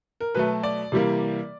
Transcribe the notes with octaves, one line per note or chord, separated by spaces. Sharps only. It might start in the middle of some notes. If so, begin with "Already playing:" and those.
A#4
B2 F#3 A3 B4
D5
C3 E3 G3 A#3